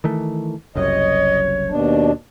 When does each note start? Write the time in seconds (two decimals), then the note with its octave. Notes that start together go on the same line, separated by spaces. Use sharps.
0.04 D#3 E3 A3
0.76 F#1 C2 F#2 C#5 D#5
1.70 D#2 B2 D4